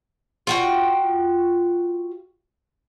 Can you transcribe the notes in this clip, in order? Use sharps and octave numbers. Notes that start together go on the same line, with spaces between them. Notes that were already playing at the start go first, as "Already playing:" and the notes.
F4 F#4 G5